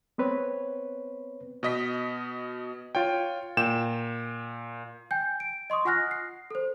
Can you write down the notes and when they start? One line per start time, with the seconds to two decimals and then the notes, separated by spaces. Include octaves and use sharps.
0.18 B3 C4 B4 C#5
1.63 B2 D#5 B6
2.95 F4 C#5 G5
3.57 A#2 G5 E7
5.11 G5 G#5 G6
5.40 D7
5.70 D#5 C6 C#6 D#6
5.85 F4 F#5 G#5 F6 F#6 A#6
6.11 C7
6.51 A4 C5